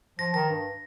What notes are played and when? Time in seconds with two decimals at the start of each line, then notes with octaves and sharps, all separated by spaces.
0.19 F3 A#6
0.34 D#3 A#6
0.50 G2